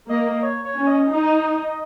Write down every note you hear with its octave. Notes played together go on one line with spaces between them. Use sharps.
A#3 D#5
C#5
C#5
C#4
D#5
D#4